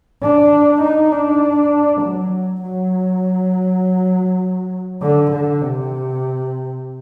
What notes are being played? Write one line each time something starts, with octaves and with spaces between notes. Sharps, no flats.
D4
D#4
D4
F#3
F#3
D3
D3
C3